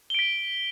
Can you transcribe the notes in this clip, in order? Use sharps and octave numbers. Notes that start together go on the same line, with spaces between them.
B6 D7 G7